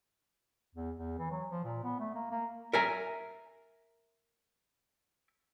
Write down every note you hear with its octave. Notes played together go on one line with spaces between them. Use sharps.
E2
E2
E3
F#3
F3
A#2
B3
A3
A#3
A#3
A#4 E5 G#5 A#5